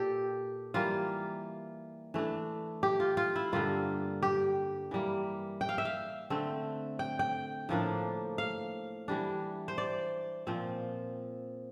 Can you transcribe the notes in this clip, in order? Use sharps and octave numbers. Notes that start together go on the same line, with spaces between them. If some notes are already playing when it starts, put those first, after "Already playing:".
Already playing: A#2 G4 A4
E3 G3 A#3 F4
E3 A3 D4
G4
F4
F4
E4
G2 D3 G3 A#3 F4
G4
E3 G3 A#3
G5
F5
E5
F5
D3 A3 C4
G5
G5
A2 F3 A#3 D4
F5
E3 G3 D4
C5
D5
A#2 F3 C4